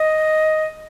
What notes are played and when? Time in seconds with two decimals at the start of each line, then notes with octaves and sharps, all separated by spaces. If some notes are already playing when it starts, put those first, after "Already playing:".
Already playing: D#5